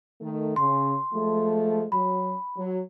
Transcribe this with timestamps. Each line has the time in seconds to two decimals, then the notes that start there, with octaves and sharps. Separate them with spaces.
0.20 D#3 A3
0.56 C#3 C6
1.13 F3 G#3 A3
1.92 F#3 B5
2.56 F#3